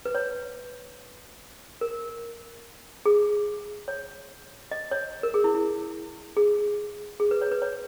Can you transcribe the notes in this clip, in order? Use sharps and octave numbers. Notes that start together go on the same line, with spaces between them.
B4
C#5
A#4
G#4
C#5
D#5
C#5
A#4
G#4
E4
E4
G#4
G#4
B4
C#5
B4
C#5